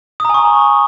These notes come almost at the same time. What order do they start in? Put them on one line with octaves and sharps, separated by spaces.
D#6 A#5 G#5 C#6